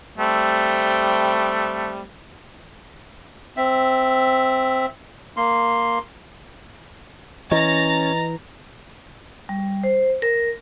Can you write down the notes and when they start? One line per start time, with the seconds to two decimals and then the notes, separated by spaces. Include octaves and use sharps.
0.18 G3 A3 C4
3.57 C4 E5
5.37 A#3 C6
7.51 E3 C#4 C#5 D#5 A#5 A6
9.49 G3
9.84 C5
10.22 A#4